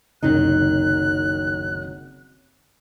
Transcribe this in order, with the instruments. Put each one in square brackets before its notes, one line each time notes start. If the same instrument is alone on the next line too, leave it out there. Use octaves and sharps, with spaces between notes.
[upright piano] F#1 C2 [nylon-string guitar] D#3 F#3 D#4 [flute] F#6